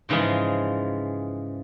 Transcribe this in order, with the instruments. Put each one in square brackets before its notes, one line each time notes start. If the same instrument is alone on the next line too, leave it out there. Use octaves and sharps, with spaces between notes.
[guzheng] G#2 C#3 E3 F3 G#3